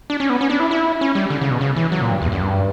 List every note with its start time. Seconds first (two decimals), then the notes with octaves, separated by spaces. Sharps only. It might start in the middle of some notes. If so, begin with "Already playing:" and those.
0.10 D4
0.20 C#4
0.30 B3
0.41 C#4
0.50 D4
0.60 E4
0.71 E4
1.01 C#4
1.15 G3
1.30 D3
1.41 C#3
1.51 B2
1.61 C#3
1.76 E3
1.92 F#3
2.01 A#2
2.11 G2
2.22 E2
2.32 F#2
2.42 G2